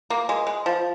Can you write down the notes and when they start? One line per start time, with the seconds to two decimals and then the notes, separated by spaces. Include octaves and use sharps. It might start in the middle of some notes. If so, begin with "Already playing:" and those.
0.10 A#3
0.29 G#3
0.47 G#3
0.66 F3